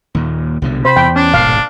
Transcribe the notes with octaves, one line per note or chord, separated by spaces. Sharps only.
D#2 A#2
C2 B2 D3
C3 C5 B5
E2 G5
C#4 D4
D#1 G#1 B2 F5